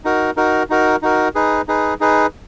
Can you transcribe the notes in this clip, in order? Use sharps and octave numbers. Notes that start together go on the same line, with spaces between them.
D#4 F#4 A#4
D#4 F#4 A#4
D#4 F#4 A#4
D#4 F#4 A#4
D#4 G#4 B4
D#4 G#4 B4
D#4 G#4 B4